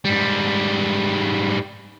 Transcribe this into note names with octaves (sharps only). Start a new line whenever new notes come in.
G#2 G3